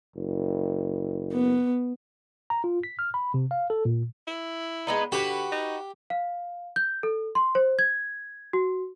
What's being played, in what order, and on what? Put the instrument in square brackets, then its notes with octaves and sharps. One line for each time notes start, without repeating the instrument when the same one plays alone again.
[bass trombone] F#1
[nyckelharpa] B3
[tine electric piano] A#5
F4
B6
F6
B5
C3
F5
A4
A#2
[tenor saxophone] E4
[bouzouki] G#3 B3 D#4
[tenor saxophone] D3 [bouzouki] F#4 B4 [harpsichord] G4
[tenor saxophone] D#4
[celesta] F5
G6
A4
C6
C5
G#6
F#4